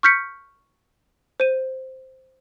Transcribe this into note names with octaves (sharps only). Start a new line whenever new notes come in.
C#6 F6 G6 B6 C#7
C5 D#7